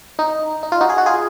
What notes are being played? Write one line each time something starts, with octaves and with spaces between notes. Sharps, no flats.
D#4
D#4
F4
D#4 F#4
G#4
F#4
F4 G#4